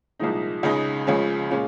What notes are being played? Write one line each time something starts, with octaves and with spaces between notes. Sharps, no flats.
C2 A#2 F3 G#3 D#4
C#2 C#3 G#3 D#4
C#2 C#3 F3 G#3 C#4
A#2 G#3 C#4 F4